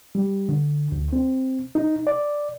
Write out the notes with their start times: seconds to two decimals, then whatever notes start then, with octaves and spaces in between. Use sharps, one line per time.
0.15 G3
0.49 D3
0.92 D2
1.13 C4
1.75 D#4
2.07 D5